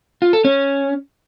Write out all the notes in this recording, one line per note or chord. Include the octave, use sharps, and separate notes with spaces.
F4
A4
C#4